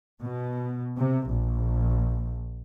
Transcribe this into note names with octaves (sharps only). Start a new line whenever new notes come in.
B2
C3
A#1